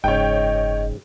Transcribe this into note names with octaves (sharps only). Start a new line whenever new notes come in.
F#1 G#2 C#3 C#5 D#5 G5